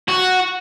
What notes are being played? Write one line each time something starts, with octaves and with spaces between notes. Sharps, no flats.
F#4